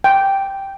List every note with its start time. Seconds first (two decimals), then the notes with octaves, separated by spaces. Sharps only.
0.04 G5